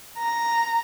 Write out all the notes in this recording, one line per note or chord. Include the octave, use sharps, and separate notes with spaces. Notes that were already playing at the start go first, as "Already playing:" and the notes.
A#5